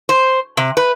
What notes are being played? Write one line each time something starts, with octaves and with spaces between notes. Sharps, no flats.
C5
C3
B4